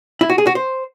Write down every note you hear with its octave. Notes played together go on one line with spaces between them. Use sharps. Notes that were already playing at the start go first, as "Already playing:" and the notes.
E4
F#4
G#4
F#4
C5